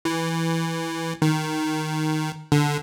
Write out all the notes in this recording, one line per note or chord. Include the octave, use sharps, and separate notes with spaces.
E3
D#3
D3